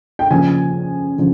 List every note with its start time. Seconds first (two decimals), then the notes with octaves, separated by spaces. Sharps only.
0.19 G5
0.30 C#3 F3 A#3 G#5
1.18 C#3 F3